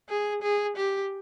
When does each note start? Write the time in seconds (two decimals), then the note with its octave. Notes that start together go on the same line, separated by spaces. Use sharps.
0.09 G#4
0.42 G#4
0.76 G4